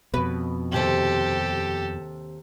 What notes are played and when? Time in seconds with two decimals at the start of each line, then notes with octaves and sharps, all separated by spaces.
0.14 F2 B2 B4
0.72 D#2 C3 G4 A4 C5